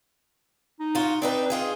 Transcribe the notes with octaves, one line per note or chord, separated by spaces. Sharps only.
D#4
F4 F#4
C4 D4 D#4 B4
D#4 F4 G#4